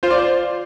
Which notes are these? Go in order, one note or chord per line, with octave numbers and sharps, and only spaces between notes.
F4 C5
D5
C5